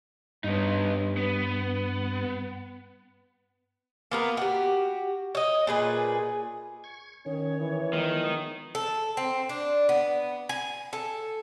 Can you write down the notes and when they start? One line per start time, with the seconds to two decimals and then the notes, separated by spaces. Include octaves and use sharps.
0.44 G2 B3 D#4
1.17 B3
4.11 A#3 B3 A#4
4.37 F#4 G4
5.35 C#5 D#5
5.67 A#2 G#4 B4
6.84 C#6 G#6
7.26 D#3 C#4 C#5
7.60 E3
7.93 D#3 F3 G#3 B3
8.75 A4
9.17 C4
9.49 D4
9.89 B3
10.49 G#5
10.93 A4